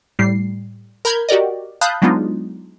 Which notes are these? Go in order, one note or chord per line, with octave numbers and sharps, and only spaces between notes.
A2 G3 C7
A#4 A#5 B5 F6 G6 G#6
F#4 G4 A#4 D5 D#5
F5 A5 B5 D#6 F#6 G6
F#3 G#3 B3 D4 D#4 F4